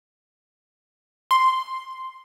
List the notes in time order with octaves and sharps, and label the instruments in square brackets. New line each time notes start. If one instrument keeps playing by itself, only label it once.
[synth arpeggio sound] C6